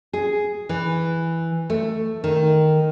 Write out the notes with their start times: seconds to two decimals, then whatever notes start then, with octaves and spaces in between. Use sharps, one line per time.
0.13 G#4
0.69 E3
1.70 A3
2.24 D#3